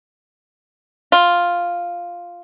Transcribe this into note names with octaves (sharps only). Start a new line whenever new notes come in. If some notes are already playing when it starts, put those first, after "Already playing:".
F4